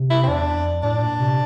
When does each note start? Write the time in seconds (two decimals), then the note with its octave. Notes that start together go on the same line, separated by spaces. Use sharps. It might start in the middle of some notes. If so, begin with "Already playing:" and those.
Already playing: C3
0.10 E4
0.23 C4
0.28 E2 D4
0.56 F2
0.83 A2 D4
1.02 A#2
1.20 C3